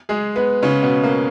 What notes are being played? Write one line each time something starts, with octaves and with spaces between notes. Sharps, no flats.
G#3 G#4
B3 B4
C#3 C#4
B2 B3
A#3